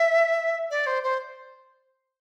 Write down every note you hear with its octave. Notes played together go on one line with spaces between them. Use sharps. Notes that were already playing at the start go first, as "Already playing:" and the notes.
Already playing: E5
D5
C5
C5